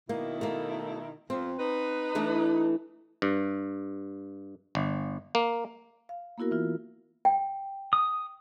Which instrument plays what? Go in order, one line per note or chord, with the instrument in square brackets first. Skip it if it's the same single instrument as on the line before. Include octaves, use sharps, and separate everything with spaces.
[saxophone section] B2 D#3 E4 [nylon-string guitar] A#3
[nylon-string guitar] A3 A#3
[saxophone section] F2 F3 [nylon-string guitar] C4
[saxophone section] D#4 B4
[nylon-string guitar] E3 A3 D4
[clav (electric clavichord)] G2
G1
A#3
[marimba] F5
A#3 B3 E4 F#4 A#4
E3 F4
[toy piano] G5
[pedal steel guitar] D#6